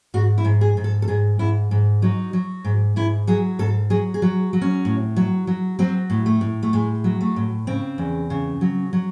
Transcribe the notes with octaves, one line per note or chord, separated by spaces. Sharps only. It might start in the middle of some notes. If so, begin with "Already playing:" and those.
G#2 F#4
E4
G#2
G#4
G#2
A4
A4
G#2 G#4
G#2 E4
G#2
F#3 D#4
F#3
G#2
G#2 E4
F#3 G#4
G#2 A4
F#3 G#4
G#4
F#3
F#3
C#4
A2
F#3
F#3
F#3 C4
A2
A3
A2
A3
A2 G#3
F#3
A3
A2
C#3 C4
E2
C#3
F#3
F#3